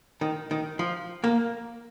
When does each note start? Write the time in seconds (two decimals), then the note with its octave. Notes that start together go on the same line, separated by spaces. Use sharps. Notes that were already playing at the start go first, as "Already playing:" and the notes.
0.21 D#3
0.51 D#3
0.79 F3
1.24 A#3